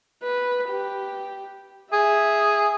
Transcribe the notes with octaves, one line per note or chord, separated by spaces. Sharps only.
B4
G4
G#4 E5